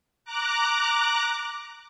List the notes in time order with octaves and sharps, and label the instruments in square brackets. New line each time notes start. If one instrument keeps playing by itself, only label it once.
[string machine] A#5 D6 F#6